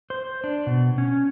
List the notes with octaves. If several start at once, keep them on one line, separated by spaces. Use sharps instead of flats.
C5
D4
B2
C#4